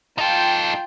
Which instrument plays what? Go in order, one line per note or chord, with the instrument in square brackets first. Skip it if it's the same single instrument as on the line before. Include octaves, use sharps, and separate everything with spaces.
[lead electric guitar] D#4 A4 [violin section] F4 G5 G6